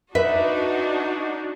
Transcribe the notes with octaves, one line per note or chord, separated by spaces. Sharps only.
D4 D#4 F#4 B4 E5